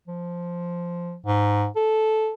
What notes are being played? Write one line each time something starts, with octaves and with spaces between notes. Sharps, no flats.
F3
G#2
A4